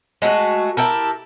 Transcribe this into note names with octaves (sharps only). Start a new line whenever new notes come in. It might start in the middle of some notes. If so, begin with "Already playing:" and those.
G#3 A3 F4 F#4
E4 G4 A4 A#4